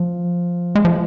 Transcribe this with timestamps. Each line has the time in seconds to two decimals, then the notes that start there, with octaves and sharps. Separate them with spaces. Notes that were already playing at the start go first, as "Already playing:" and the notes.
Already playing: F3
0.75 G#3
0.85 F3